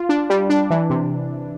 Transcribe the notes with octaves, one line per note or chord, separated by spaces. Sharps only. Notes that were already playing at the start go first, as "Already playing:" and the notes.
Already playing: F4
D4
G3
D4
E3
C3